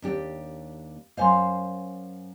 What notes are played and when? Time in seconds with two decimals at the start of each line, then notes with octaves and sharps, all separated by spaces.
0.02 D#2 D4 G4
1.17 F#2 C5 D#5 F5 G#5 C6